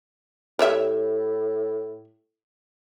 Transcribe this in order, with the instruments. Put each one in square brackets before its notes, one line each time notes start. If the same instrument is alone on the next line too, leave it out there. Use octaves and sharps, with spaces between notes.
[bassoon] A2 [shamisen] G3 C#5 E5